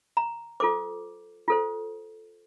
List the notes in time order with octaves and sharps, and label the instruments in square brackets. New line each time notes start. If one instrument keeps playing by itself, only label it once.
[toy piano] A#5
F4 A4 C5 D6
F4 A4 C5